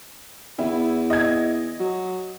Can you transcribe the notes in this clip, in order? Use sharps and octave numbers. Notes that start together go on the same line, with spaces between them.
E2 E4
D#5 G#6
F#3